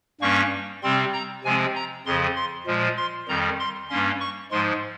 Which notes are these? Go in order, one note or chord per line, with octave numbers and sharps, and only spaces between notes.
G2 G3 A#3 C#4 C#6
C3 G3 C4 C6
A#5
C3 F3 G#3 C4 G#5
A#5
F2 C#3 F3 C6
C6
A#2 F3 G#3
C6
F2 D#3 G3 A#5
C6
G2 G3 A#3 C#4 C6
C#6
G#2 F3 G#3 C6